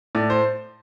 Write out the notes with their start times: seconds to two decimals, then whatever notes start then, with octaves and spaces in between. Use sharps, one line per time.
0.15 A2 D5
0.30 C5